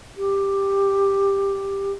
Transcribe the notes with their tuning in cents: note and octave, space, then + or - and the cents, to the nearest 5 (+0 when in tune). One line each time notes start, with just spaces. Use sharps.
G4 +10